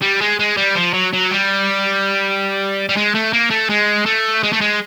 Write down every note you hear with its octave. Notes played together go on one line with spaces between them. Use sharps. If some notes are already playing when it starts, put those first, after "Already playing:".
G3
G#3
G#3
G3
F3
F#3
F#3
G3
G3
G#3
A3
A#3
A3
G#3
A3
G#3
A3
G#3